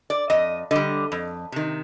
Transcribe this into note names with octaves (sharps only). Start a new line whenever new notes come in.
D5
F2 D#5
D3 G3 D#5
F2
C3 D#3